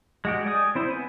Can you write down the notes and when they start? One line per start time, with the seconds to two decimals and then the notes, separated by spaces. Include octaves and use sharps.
0.25 G#3 F#4 G4
0.46 D5 G5 G#5 D#6
0.75 C4 E4 C5
0.90 B3 G#5